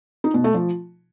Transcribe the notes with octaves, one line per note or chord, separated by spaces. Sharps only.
D#4
B2
A3
F3